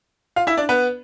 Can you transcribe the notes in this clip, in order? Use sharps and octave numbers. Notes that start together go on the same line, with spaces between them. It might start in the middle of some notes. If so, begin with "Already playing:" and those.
F4 F5
E4 E5
D4 D5
B3 B4